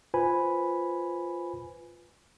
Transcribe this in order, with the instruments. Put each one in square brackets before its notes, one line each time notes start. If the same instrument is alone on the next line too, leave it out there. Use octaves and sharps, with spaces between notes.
[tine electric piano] F4 B4 C5 G#5 B5